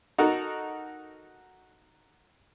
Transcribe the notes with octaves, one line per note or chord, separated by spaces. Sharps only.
D#4 F#4 A4 A#4